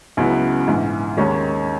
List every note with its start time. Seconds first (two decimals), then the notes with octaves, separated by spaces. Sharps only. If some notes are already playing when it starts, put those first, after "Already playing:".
0.17 C#2 C#3 F#3 B3 E4
0.68 A#1 G#2 E3
1.17 D#2 D#3 G#3 C#4